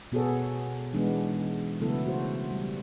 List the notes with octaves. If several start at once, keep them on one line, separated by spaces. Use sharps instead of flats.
B2 B3 F#4 G#4 A4 C#5
E3 G#3 B3 D4 D#4
C#3 F#3 A3 B3 E4 A4
F#4 C5
G3